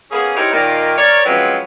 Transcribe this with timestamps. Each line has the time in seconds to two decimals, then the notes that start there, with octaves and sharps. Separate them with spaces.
0.11 A#3 B3 C#4 G#4
0.36 D#4 E4 G4 A#4 C5 C#5
0.52 A#2 D#3 A#3
0.97 A#4 C#5 D5
1.25 F3 F#3 G#3 C4 C#4 B4